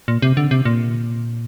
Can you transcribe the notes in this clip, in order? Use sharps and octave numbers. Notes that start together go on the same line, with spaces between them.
A#2
C3
D3
C3
A#2